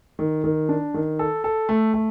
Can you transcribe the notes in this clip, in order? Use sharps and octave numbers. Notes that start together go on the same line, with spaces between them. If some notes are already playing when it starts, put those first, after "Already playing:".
D#3
D#3
D4
D#3
A4
A4
A3
A3